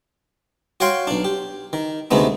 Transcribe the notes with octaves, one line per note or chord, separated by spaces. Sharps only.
F#4 C#5 F5 G5 C6
B1 D4
G4
D#3
D2 C3 D#3 G#3 A3 B3